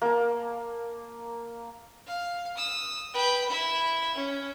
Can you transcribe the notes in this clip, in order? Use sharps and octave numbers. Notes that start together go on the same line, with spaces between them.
A#3 A5
F5
D#6 E6
B4 G5
E4 E5
C#4